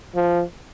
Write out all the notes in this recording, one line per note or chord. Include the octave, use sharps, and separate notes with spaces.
F3